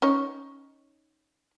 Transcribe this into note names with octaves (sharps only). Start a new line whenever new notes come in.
C#4 D#4 C#5